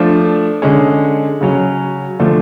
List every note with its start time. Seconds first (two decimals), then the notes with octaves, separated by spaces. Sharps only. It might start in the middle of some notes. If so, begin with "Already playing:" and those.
Already playing: F3 A3 D4
0.62 D3 G#3 C#4
1.41 C#3 F#3 C#4
2.19 D3 F3 A3 D4